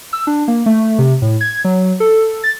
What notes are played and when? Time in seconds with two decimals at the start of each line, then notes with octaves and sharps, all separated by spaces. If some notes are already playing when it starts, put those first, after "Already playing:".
0.13 E6
0.27 D4
0.48 A#3
0.66 A3
0.99 C3
1.22 A2
1.41 G#6
1.65 F#3
2.00 A4
2.44 A6